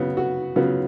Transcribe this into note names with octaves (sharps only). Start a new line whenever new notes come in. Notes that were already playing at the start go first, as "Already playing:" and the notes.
Already playing: C#3 F#3 B3
F#4
C#3 F#3 B3 F4